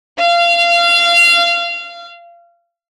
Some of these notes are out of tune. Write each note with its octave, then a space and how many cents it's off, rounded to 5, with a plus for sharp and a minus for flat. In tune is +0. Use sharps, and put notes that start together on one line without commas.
F5 -25